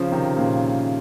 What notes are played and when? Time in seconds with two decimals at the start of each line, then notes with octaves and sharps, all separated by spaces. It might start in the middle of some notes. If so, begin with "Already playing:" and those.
Already playing: C#3 F3
0.12 C3 D#3
0.37 A#2 C#3